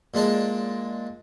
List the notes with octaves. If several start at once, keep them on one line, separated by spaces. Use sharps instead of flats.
A#2 G#3 D4 A5